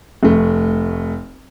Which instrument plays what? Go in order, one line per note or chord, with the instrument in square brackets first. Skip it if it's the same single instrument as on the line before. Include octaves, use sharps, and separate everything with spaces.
[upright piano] F1 A3